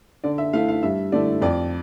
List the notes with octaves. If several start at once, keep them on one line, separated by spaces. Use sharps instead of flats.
D3 D5
E5
A3 E4 F5
F5
G2 E5
D3 A3 E4 D5
F2 D5